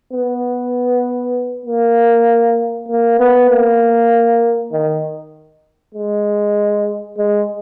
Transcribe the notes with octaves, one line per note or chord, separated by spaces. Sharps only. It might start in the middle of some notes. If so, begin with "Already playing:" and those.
B3
A#3
A#3
B3
A#3
D#3
G#3
G#3